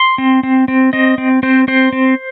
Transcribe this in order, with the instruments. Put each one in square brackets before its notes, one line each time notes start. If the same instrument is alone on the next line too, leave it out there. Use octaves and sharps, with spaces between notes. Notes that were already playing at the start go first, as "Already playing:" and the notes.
Already playing: [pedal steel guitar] C6
C4
C4
C4
C4 D#5
C4
C4 C5
C4 C5
C4